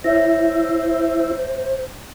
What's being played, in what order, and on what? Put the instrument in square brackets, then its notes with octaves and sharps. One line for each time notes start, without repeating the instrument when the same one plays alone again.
[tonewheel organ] E4 [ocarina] C5 [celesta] C#5 E5 A#6